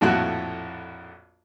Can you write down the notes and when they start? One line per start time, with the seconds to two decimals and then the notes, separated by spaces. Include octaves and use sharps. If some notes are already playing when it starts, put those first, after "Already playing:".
0.01 A#1 F2 A2 F#4 F#6